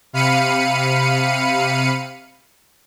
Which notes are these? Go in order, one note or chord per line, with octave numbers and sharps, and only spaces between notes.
C3 F5 B5 C#7 D#7